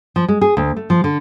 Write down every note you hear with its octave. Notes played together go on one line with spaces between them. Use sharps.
F3
G#3
G#4
D2
A3
F3
D3